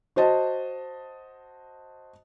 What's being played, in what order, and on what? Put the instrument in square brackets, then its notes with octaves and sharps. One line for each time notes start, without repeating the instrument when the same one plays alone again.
[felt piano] F#4 C5 D#5 A5